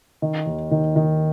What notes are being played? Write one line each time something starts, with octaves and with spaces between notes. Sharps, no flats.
D#3
D#2
D#3
D#3